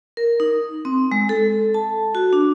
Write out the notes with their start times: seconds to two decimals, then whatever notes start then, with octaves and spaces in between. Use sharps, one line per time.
0.17 A#4
0.40 D#4
0.85 C4
1.12 G#3
1.29 A4
1.74 A5
2.15 F#4
2.33 D4